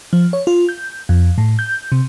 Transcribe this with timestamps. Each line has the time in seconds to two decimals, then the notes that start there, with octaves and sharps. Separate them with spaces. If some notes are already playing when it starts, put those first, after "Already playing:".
0.13 F3
0.33 C#5
0.47 F4
0.69 G6
1.09 F2
1.38 A2
1.59 G6
1.92 C3